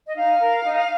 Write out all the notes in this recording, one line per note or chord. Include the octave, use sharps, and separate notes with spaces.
D#5
D#4 F5
A#4
D#4